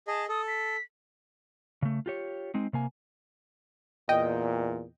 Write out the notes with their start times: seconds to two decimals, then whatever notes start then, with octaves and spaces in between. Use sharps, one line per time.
0.07 G#4 D#5 A5
0.29 A4 D#6
0.48 B6
1.82 C#3 A3
2.06 F4 G4 C#5
2.54 G#3 C4 D#4
2.73 C3 A#3 G#5
4.09 E2 A#2 D#5 G5